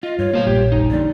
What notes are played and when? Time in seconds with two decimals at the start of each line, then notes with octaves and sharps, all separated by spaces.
0.03 F4 D#5
0.19 G2 C#5
0.34 B2 D3 A#3 F4 C5 F5
0.47 A#1 G3 G4
0.72 F#1 D#4
0.91 F2 A#2 D3 D5